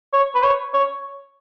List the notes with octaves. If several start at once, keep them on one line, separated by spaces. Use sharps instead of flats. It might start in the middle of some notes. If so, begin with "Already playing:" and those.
C#5
B4
C#5
C#5